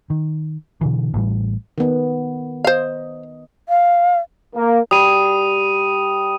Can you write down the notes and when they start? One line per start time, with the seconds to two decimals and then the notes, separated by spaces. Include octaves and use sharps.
0.10 D#3
0.81 B2 D3 E3
1.14 A1 A2 G3
1.78 D#3 B3
2.64 C5 D#5 F5
3.69 F5
4.55 A#3
4.91 G3 D#6 D#7